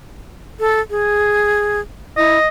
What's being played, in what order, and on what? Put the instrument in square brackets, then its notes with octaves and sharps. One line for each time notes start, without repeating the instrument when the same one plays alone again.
[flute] A4
G#4
[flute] E4 [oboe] D#5